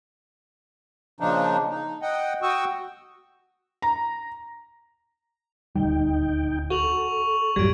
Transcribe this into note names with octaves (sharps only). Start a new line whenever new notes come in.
A#2 C#3 F3 D4 D#4
D#4
D#5 F#5 G5
F#4 G5 C#6 D#6 E6
A#5
D#1 D2 G3 D#4 G5
F#4 A4 C#6 F7 F#7
A1 F#2 A2 F#3 G3 G#6 D7